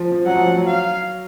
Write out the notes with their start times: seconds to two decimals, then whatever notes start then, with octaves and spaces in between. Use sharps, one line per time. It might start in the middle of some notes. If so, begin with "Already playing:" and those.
Already playing: F3
0.12 F3
0.26 F#3 F#5
0.36 F3
0.46 F#3
0.57 F#3
0.67 F5